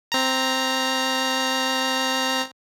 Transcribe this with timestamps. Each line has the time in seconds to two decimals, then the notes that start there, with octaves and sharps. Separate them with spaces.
0.12 C4 A#5